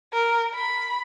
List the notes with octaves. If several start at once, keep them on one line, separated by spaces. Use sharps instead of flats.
A#4
B5